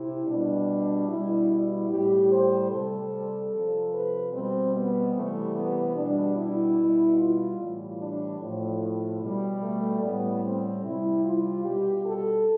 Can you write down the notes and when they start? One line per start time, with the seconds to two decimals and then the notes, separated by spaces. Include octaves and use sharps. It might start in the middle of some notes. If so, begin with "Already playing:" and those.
Already playing: C3 E4
0.27 B2 G3 D4
1.09 B2 G3 E4
1.49 E4
1.89 A2 G3 G4
2.31 C5
2.71 C3 G3 A4
3.52 C3 F3
3.93 B4
4.33 B2 G3 C4
4.74 B3
5.15 C3 E3 G3 A3
5.56 B3
5.96 B2 G3 D4
6.37 E4
6.77 B2 G3
7.18 F4
7.59 A2 E3 G3
7.99 D4
8.40 A2 F3
9.21 B2 G3
9.61 A3
10.02 A2 G3 B3
10.43 C4
10.84 C3 G3 E4
11.24 F4
11.64 B2 G3 G4
12.05 A4